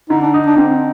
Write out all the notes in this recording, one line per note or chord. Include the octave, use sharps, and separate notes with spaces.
D3 D#4
D4
D#4
D4
D3 C4